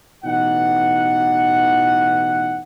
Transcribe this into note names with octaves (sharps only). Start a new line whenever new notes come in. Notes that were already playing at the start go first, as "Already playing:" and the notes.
A1 B2 E3 D#4 F#5